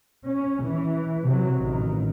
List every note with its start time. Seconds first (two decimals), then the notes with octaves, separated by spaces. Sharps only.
0.25 C#4
0.63 E3
1.24 C3 F#3
1.59 A1 D#3